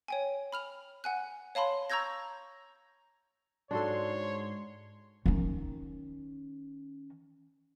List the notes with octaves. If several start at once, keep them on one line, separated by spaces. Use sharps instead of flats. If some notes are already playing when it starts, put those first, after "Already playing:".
C#5 G5 G#5
B5 F6 F7
F#5 G#5 F#6
C#5 F5 A5 B5 C6
A#5 C#6 E6 G6 G#6 A#6
G#2 D4 F#4 A4 C#5 C6
D#3 C#4